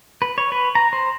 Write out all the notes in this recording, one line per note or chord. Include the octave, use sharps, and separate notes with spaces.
B4
C#5
B4
A#5
C5